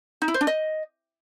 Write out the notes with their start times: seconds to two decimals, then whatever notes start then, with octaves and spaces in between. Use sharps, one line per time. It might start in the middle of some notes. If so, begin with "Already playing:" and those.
0.22 D#4
0.28 E4
0.34 C5
0.41 D4
0.47 D#5